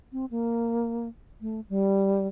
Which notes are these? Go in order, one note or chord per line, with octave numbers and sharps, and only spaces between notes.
C4
A#3
A3
G3